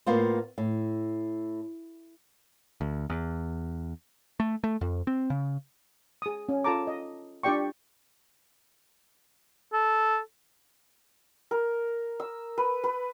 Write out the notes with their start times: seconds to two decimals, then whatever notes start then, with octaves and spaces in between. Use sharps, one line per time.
0.07 A2 A#3 B3 F4 C5
0.58 A2
2.81 D2
3.10 E2
4.40 A3
4.64 A3
4.81 F2
5.07 C4
5.30 C#3
6.22 G#4 D#6
6.49 C#4
6.64 F4 A4 A5 A#5 D6
6.87 D#5
7.43 D4 F4 G4 D5 G5 C#6
9.73 A4
11.51 A#4
12.20 E6
12.58 B4
12.84 B4